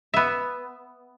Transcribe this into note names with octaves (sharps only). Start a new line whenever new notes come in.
B3 E5